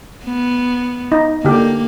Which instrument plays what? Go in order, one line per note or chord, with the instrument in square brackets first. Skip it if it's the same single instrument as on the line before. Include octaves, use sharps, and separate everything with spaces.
[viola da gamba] B3
[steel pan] D#4
[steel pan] D3 G4 [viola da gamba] A#3